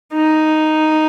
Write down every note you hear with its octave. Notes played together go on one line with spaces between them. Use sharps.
D#4